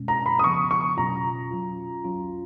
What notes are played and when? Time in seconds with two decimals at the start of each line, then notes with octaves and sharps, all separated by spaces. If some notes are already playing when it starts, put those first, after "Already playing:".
Already playing: B2 G#3 C#4
0.08 A#5
0.26 B5
0.39 D#6
0.44 C#3 F3 B3 C#6
0.71 C#6
0.97 B2 F#3 C#4 F4 A#5
1.51 F#3 C#4 F4
2.04 F#3 C#4 F4